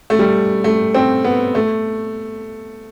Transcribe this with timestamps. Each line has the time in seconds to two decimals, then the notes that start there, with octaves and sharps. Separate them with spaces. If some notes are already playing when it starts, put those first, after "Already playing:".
0.10 A3
0.19 G3
0.64 A3
0.95 C4
1.25 B3
1.55 A3